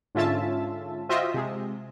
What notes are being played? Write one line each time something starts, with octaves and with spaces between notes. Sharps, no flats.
G#2 D3 C#4 F4 E5 A5
F4 F#4 C5 D#5 E5 G5
C3 G#3